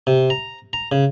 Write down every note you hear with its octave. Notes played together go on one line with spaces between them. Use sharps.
C3
A#5
A#5
C#3